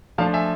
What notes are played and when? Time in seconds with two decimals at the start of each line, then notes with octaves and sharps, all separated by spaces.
0.18 F3 A3 D4 F5 A5
0.33 E5 G#5